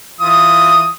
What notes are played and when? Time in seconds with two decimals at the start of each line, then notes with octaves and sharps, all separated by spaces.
0.20 E3 F4 D#6